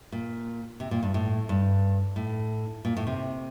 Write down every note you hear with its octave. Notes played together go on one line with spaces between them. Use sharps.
A#2
C3
A#2
G2
A2
G2
A2
A#2
A2
C3